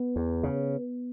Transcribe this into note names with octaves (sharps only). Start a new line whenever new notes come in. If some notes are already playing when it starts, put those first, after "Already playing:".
Already playing: B3
E2
C#3